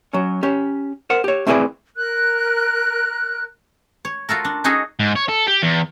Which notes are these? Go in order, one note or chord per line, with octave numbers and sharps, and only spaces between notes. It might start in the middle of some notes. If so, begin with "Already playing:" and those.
F#3 C#4
C#4 G4
A#4 C5 F#5
G4 C#5
A3 C4 E4 G#4 B4 D5
A#4 F#6
C#5
F4 F#4 A4 A#4
D4
C#4 D#4 F#4 G#4 A4 G#5
G#2
C#5
A4
G4
E2